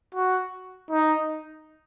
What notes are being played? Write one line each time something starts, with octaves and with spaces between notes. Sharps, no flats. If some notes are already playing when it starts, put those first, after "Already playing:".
F#4
D#4